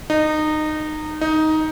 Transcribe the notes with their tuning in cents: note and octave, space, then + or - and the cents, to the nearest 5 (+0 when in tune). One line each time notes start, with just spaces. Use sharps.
D#4 -20
D#4 +10